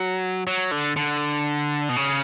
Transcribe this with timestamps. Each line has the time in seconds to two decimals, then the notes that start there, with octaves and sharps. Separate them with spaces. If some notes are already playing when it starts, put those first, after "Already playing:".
Already playing: F#3
0.47 F#3
0.71 D3
0.96 D3
1.89 B2
1.97 C#3